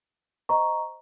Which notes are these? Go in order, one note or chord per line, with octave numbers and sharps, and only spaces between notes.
C5 D#5 A#5 C#6